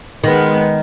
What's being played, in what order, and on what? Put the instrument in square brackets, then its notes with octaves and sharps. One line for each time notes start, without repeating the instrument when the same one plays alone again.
[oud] D#3 [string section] G#3 B3